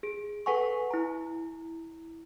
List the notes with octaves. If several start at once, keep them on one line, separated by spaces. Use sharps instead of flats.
G#4 D7
A4 B4 F#5 G#5 C#6
E4 A#5